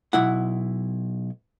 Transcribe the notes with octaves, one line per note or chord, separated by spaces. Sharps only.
B1 E4 F#5